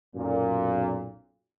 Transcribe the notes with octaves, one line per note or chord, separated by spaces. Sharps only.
B1 F#2 A#2